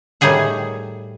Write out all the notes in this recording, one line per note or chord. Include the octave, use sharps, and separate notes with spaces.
A2 D#3 G3 G#4 F#5